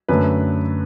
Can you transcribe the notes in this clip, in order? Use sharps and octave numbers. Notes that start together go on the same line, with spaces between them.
F#2 D3 A3 B4